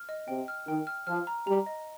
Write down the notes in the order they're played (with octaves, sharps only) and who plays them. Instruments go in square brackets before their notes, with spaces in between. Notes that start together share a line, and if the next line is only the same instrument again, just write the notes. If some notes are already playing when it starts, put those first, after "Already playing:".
Already playing: [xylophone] F6
D#5
[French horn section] C3 [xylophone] G5
[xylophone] F6
[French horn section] D#3 [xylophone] G5
[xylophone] F6
[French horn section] F3 [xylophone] F6
[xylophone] A#5
[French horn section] G3 [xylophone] A#5
[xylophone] D#5